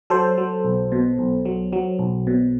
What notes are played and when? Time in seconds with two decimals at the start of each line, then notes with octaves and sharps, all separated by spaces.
0.10 F#3 A4 C5
0.38 F#3
0.65 B1
0.92 B2
1.19 B1
1.45 F#3
1.73 F#3
1.99 B1
2.27 B2